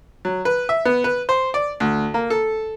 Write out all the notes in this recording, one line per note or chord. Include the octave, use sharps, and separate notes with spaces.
F#3
B4
E5
B3
B4
C5
D5
D2
A#3
A4